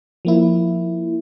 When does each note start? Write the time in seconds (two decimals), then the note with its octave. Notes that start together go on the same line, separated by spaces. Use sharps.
0.25 F3 A#3 E4